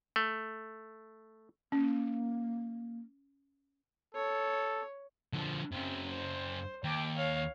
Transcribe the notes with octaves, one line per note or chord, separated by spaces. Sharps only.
A3
A#3 C#4
A4 C#5
D3 F3
F#2 C#3 C4
C5
D#2 G5 D6
C#5 F5